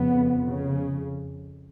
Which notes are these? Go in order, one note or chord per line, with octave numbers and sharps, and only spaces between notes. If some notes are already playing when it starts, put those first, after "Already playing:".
Already playing: F2 C#3 B3
C#3